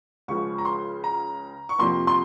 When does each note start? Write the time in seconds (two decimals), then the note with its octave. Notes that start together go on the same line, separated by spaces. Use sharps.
0.28 C#2 C#3 F3 G#3 C#6
0.58 A#5
0.65 C6
1.04 A#5
1.69 C#6
1.78 F2 C3 F3 A#3 C6
2.07 C6